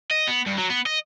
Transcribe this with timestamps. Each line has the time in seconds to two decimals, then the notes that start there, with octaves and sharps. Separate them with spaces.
0.11 D#5
0.28 B3
0.47 G2
0.58 F#3
0.70 B3
0.86 D#5